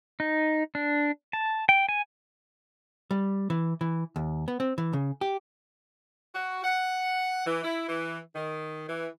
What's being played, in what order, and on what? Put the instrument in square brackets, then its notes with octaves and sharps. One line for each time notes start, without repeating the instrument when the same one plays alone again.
[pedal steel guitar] D#4
D4
A5
G5
G#5
[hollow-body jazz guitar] G3
E3
E3
D#2
B3
C4
E3
C#3
G4
[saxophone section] F#4
F#5
E3
E4
E3
D#3
E3